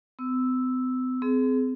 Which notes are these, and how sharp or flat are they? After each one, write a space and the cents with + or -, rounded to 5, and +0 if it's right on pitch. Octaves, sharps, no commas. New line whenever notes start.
C4 -45 E6 -5
C4 -30 G#4 +30